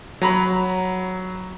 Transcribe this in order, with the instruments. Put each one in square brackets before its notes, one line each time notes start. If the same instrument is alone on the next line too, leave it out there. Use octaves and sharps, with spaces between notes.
[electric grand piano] F#3 A#5 B5